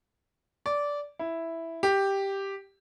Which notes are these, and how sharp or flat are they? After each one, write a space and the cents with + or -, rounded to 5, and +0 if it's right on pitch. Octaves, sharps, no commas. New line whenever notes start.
D5 -15
E4 +0
G4 +0